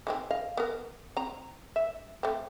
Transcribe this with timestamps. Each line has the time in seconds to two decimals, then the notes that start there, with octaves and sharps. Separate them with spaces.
0.07 D#3 G#3 C4
0.31 D#5 F5
0.57 B3 A#4
1.17 C4 A#5
1.76 E5
2.23 A3 C4